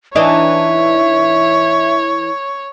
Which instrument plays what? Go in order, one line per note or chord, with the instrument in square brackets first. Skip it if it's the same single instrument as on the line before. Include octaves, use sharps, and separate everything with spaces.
[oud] E3 D4 D#4 [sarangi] C#5 [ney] E5